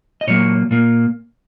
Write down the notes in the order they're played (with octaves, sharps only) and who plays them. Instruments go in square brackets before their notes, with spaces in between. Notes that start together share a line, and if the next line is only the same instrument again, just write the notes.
[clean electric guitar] D#5
A#2 F#3 A#3 C#5
A#2 A#3